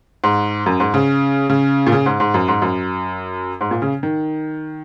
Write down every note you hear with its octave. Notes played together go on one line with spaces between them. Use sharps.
G#2
F#2
G#2
C#3
C#3
A#2
C#3
G#2
G#2
F#2
G#2
F#2
G#2
A#2
C#3
D#3